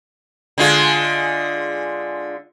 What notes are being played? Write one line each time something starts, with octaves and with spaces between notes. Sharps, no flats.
D3 G#3 F4